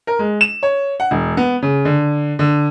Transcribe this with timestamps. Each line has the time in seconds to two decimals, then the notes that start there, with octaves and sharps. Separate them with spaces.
0.07 A#4
0.19 G#3
0.41 E7
0.63 C#5
1.00 F#5
1.11 E1
1.37 B3
1.62 C#3
1.85 D3
2.39 D3